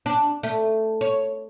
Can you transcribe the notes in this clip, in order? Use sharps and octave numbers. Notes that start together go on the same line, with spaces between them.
D4
A3
C#5